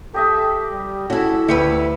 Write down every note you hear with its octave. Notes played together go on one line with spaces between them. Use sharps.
G4 A4 D#5 E5
G3
C#4 E4 F#4 A4
D2 A3 E4 G4 B4 C#7